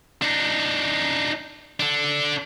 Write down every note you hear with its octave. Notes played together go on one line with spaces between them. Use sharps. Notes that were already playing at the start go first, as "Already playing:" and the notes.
D4 D#4
D4 A4